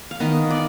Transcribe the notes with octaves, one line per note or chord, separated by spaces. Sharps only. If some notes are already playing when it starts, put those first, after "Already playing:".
F5
D#3 B3 D#5
D5